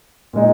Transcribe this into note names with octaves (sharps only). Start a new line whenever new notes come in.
A#2 G#3 D#4